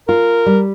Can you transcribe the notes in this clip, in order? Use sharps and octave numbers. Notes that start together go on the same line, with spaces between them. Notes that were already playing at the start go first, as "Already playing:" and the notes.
F4 A#4
G3